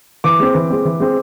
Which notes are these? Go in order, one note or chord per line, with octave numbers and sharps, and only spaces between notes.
E3 D6
G#3 C4
E3
G#3 C4
E3
G#3 C4